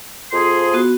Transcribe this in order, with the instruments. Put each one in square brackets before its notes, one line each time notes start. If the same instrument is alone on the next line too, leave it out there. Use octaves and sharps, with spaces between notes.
[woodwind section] F2 G#4 C6
[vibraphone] B3 F#4